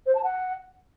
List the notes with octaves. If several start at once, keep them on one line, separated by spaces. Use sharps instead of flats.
C5
A5
F#5